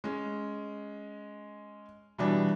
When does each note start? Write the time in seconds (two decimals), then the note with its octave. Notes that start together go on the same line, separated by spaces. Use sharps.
0.04 G#3 C#4
2.18 B2 E3 G3 D4